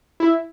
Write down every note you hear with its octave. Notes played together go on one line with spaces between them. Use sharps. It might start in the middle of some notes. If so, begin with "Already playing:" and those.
E4